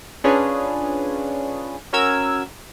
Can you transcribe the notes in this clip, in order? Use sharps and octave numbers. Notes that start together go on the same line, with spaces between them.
C#4 D4 F4 G#4 B4 C#5
C#4 F#4 A#4 E6 G#6